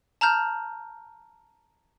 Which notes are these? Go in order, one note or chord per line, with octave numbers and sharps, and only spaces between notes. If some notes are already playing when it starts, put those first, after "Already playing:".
A5 A#5 F6 G6